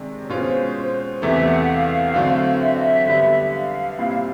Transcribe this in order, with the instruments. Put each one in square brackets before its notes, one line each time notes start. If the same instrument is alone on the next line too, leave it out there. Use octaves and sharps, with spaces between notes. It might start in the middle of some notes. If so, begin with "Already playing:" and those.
Already playing: [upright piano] C3 D#3 G#3 D4
[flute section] C#5
[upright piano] B2 G#3 C#4 F4 [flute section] C5
[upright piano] E2 C3 E3 A3 [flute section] E5
[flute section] F#5
F5
[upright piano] D3 F#3 A3 C4
[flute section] E5
D#5
E5
[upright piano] D3 G3 B3
[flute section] F5
[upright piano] A#2 G3 C4 E4